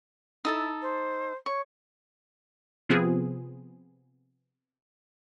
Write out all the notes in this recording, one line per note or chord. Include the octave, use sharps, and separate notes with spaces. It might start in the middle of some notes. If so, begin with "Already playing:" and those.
D#4 E4 A4 A5
C5
C#5 C#6
C3 F3 B3 C4 F4 G#4